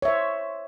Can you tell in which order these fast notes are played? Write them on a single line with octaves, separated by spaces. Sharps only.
C#5 E5 C5